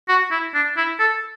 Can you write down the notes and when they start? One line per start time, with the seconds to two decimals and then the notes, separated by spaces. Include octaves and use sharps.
0.08 F#4
0.31 E4
0.54 D4
0.77 E4
1.00 A4